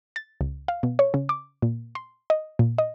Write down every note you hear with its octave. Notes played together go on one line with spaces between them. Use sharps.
A6
C#2
F5
B2
C#5
C#3
D6
A#2
C6
D#5
A#2
D#5